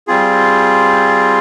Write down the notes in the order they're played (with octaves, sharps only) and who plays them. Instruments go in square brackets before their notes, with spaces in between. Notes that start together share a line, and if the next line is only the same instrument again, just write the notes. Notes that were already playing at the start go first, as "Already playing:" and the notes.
[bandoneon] G3 C4 F4 G#4